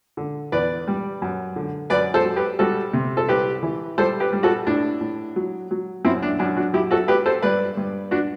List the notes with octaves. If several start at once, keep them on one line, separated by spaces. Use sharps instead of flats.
D3
E2 B4 D5
G3
F#2
D3
F#2 B4 D5
A4 C5
F#3
G4 B4
G3 F#4 A4
C3
A4
C2 G4 B4
E3
G3 A4 C5
G4 B4
G3
F#4 A4
A2 D4
A2
F#3
F#3
F#2 C4 E4
D4
F#2 D4
D4 F#4
F#3 E4 G4
F#4 A4
F#3 G4 B4
A4 C5
G2 B4 D5
G2
D4 F#4